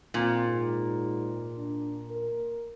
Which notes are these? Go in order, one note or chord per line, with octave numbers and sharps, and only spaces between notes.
A#2 C4
G#2
D4
A#4